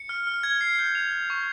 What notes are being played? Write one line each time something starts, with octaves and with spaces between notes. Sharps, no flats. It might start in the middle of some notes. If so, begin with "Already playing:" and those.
Already playing: C#7
F6
F6
G#6
C7
G6
F7
F7
C#6